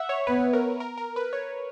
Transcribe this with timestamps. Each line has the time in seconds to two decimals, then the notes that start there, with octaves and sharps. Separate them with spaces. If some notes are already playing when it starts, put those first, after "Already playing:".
Already playing: E5 F#5
0.09 C#5
0.27 B3 B4
0.53 A#4
0.80 A#4
0.97 A#4
1.16 B4
1.33 C#5